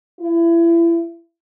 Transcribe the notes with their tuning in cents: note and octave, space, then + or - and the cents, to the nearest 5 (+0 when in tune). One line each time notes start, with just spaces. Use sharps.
E4 +30